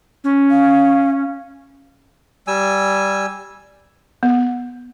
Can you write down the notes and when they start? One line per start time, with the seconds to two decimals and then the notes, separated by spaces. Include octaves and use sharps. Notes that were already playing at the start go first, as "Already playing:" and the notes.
0.24 C#4
0.51 F5
2.47 G3 G#5 E6
4.23 B3